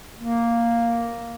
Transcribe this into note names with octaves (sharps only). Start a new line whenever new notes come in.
A#3